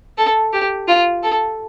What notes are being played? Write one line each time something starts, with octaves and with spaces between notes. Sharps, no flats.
A4
G4
F4
A4